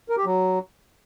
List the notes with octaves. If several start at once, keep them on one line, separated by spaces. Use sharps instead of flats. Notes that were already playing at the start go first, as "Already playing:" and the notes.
A#4
G4
F#3